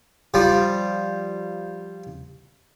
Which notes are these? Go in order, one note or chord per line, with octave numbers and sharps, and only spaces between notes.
F3 G3